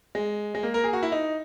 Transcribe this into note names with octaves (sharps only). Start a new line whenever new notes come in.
G#3
G#3
A#3
A#4
G#4
F#4
E4
D#4